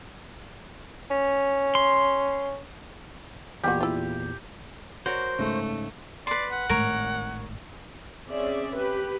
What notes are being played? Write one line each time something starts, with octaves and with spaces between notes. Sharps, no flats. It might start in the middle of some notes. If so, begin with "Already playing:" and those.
C#4
C6
E2 A#2 G3 G#3 F#4 G4
E4 F4
F#4 A#4 C5 C#5
G#2 C#3 A3
B4 D5 C6
F#5
G#1 A2 A#4 C#5
C4 C#4 G#4 D5 E5
G4 B4